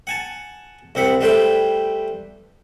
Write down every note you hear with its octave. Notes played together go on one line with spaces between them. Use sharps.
F#5 G#5 A5
C2 C4 F#5 B5
G3 A3 B4 C5 G5